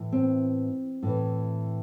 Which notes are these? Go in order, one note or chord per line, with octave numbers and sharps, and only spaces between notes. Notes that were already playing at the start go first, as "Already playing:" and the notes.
Already playing: A2 E3
C4
A2 E3